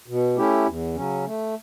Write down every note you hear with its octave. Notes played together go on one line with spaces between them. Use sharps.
B2
A3 C#4 E4 G4
E2
C#3 F#3 C#4
A3